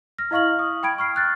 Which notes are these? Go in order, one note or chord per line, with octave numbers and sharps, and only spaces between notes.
F6 A#6
E4 D#5 F5 C#6 F6 F#7
D#6
G5 B5 G#6 D7
C#6 F6 C7
F6 F#6 A6